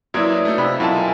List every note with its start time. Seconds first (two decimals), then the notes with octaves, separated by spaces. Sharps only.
0.14 F#2 F#3 A#3 E4 B4 C#5 D5 D#6
0.45 A3 D#4
0.58 C3 F4 G4 A4 B5
0.80 F#2 B2 B3 E4 F4 A#4 A5
0.96 C4 E5 G#5 A#5